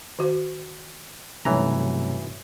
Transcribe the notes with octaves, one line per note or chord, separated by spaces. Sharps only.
D#3 F#4 C5
B1 G2 C3 E3 F#3 A3 C#4 A#5